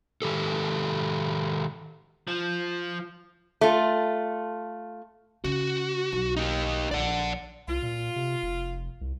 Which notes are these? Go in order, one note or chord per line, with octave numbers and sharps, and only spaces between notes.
D#3 G4 A4
F3
A3 F4
C#3 F#4
B1
D#4 G4
A#1 D5 F#5
C2 F4
A#2
C3
F1
C2